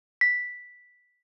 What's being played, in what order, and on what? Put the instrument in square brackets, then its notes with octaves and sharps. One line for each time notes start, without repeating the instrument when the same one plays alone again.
[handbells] B6